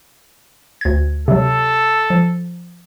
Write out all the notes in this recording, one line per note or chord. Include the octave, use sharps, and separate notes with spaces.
D2 G#6
C3 F#3 A4
F3